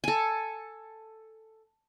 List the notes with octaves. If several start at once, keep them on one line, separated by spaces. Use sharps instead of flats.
A4 G#5